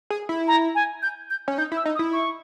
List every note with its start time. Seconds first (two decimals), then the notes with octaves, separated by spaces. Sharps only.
0.10 G#4
0.29 E4
0.48 A#5
0.75 G#5
1.02 G6
1.30 G6
1.48 C#4
1.58 D#4 G6
1.72 E4
1.77 E6
1.86 D#4
1.95 D#6
1.99 E4
2.13 C#6